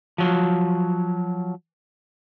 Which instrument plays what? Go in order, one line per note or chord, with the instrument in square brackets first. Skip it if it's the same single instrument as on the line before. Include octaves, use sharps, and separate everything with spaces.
[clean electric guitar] F3 F#3